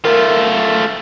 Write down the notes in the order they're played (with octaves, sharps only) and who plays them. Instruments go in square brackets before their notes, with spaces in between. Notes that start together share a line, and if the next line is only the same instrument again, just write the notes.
[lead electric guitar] A3 F4 [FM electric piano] A#4